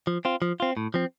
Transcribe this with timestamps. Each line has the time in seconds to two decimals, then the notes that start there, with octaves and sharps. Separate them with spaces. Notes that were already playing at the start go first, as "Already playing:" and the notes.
0.07 F3
0.25 C4 F4
0.42 F3
0.60 C4 F4
0.77 A2
0.94 F3 C4